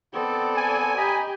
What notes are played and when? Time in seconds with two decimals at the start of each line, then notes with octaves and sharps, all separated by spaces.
0.14 B3 C4 A4 D5
0.57 G#5
0.98 G4 D#5 A#5 B5